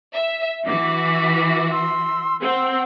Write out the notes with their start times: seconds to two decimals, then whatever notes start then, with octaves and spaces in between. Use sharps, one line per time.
0.12 E5
0.66 E3 F#4 D6
1.70 C6 E6
2.42 C4 F#5 C6 E6